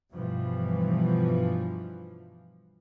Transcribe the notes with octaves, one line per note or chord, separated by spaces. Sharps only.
G2 B2 E3 F3